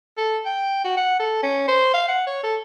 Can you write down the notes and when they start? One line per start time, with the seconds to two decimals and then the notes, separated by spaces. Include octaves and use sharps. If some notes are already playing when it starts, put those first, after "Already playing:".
0.18 A4
0.45 G5
0.84 F#4
0.97 F#5
1.20 A4
1.43 C#4
1.68 C5
1.94 F5
2.08 F#5
2.27 C#5
2.43 A4